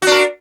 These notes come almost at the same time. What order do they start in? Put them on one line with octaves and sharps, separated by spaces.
F#4 D4 A#4